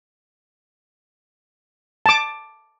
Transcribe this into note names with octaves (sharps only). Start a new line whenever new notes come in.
A5 D6